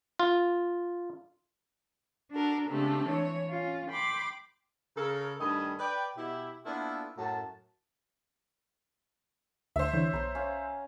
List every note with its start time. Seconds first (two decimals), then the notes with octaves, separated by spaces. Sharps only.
0.19 F4
2.32 D4 F#4 A4 A#4
2.69 C#3 G#3 A3 C4 D4 G4
3.07 E3 C#5
3.49 C#4 F4
3.89 G5 B5 C6 D6
4.96 C#3 A4 A#4
5.39 G2 D#3 A3 D#5 G#5 B5
5.79 B4 D5 G5
6.17 B2 E4 G4
6.65 A#3 B3 D4 E4 F4 A4
7.17 F#2 A2 A5
9.76 D2 C5 E5
9.93 D3 E3 C#5
10.13 B1 A#5 C6
10.35 C#4 F5